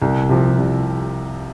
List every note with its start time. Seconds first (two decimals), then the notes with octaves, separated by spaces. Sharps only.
0.02 C2
0.29 C3 F3
0.58 C2